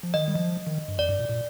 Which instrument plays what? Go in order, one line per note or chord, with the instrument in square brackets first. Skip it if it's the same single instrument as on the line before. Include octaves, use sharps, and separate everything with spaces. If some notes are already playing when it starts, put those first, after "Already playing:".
[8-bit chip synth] F3
[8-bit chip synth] D#3 [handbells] D#5
[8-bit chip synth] G3
F3
D#3
G2
[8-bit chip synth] F2 [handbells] D5
[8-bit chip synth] G2
A#2
A#2